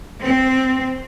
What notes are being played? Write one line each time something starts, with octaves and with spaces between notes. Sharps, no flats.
C4